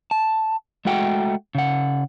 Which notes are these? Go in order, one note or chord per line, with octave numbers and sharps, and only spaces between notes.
A5
G#3 A3 F#4 F#5 G5
C#3 F#5